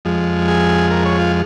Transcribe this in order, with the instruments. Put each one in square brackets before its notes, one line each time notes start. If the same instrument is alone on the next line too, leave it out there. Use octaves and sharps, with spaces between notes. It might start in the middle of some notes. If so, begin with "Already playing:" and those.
[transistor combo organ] F2 F3 G#3
G#4
A#4
C#5
F4